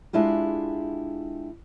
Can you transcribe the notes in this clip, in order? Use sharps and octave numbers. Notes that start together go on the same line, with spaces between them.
G#3 D4 E4 F4 G4